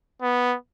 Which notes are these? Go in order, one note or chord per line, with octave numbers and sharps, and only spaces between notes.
B3